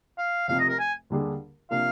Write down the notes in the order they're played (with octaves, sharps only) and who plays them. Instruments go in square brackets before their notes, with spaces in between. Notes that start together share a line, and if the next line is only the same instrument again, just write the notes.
[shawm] F5
[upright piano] F1 F2 C3 [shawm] F5
[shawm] D#5
A#4
G#5
[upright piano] D#2 D3 G3 D4 G#4
[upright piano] C3 F3 A#3 D4 [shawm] F5